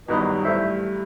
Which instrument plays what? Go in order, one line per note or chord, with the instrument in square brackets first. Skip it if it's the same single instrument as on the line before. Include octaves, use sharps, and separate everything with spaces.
[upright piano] G1 G2 D#3 F#3 B3 [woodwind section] B4 D#5
[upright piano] G2 E3 A3 [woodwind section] C5 E5